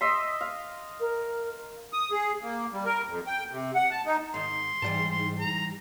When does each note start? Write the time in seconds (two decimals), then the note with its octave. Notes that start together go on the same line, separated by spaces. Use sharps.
0.01 D#5 E5 C6
0.41 F5
1.00 A#4
1.93 D#6
2.11 G#4
2.43 A#3
2.73 G3
2.85 A#4
3.08 F2
3.27 G5
3.51 C3
3.75 F#5
3.91 A5
4.06 D#4
4.34 G#2 D#3 C6
4.82 G#2 E3 G3 A5
5.10 C6
5.40 A#5